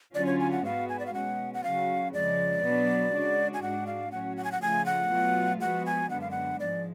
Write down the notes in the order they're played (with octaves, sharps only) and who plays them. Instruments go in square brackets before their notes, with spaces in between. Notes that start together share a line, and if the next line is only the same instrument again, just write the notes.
[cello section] D3 F#3 C#4 F4 [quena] D5
[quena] C#5
G#5
F#5
[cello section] G#2 G#3 B3 F#4 [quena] F5
[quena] G#5
D5
F5
[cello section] B2 G#3 C#4 [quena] F#5
[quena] F#5
[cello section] C#3 F#3 C#4 F#4 [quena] F5
[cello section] F2 C#3 F3 G#3 [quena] D5
[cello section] B2 F#3 B3 D4
C#3 G#3 D4 F#4
[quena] G#5
[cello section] G#2 G#3 D4 F#4 [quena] F#5
[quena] F5
[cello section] A2 F#3 C#4 F#4 [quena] F#5
[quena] F#5
G#5
F#5
[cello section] C#3 F3 A3 F4 [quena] G#5
[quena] F#5
[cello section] B2 F#3 A3 F4
[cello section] F3 G#3 B3 F#4 [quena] F#5
[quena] G#5
[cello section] F#2 D3 G#3 B3 D4 [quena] F#5
[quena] F5
F#5
[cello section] G#2 F3 G#3 [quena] D5